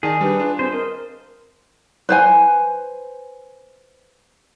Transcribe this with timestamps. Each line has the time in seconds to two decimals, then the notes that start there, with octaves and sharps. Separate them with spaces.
0.03 D#3 D#4 G#4 D5 A5
0.21 G3 D4 G4 B4
0.39 D4 F4
0.59 C4 C5
0.72 A#4 D#5
2.09 B4 C5 G#5